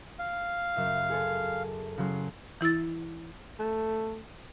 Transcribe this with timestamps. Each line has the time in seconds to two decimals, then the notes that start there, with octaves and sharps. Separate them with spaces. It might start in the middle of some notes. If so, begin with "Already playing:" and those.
0.19 F5
0.76 F#2 C#3 E5
1.09 G#4 A4 C5
1.98 C#3 F#3 C6
2.61 E3 E4 E6 A6
3.59 A3